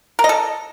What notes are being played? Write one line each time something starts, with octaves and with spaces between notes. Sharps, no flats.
A#4
D#5
A4